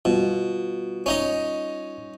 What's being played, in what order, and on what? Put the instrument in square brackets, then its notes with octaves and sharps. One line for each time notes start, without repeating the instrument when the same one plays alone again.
[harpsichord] B2 [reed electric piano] G3 F4
[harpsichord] C#4 D#4 D#5